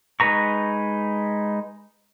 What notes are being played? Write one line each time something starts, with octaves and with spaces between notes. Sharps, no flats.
G#3 D#4 B4 A#5 C#6